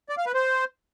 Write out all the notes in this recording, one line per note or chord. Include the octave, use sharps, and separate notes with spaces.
D5
F5
B4
C5